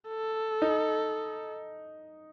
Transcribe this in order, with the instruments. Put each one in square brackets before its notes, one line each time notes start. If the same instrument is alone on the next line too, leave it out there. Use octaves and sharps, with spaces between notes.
[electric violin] A4
[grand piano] D#4